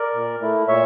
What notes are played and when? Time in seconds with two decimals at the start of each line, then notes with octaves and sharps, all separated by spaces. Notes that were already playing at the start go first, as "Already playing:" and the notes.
Already playing: A#4 D5
0.14 A#2
0.41 A3 E4
0.68 A#2 C#5 E5